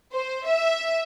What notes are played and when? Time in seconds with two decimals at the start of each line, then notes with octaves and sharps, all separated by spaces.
0.13 C5
0.47 E5